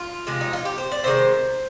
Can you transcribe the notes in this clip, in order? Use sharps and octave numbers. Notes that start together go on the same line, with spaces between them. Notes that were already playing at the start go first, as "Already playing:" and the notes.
Already playing: F4
C3 F3 G#3
D#4
F4
G4
C5
D5
C3 D#3 G#3 C5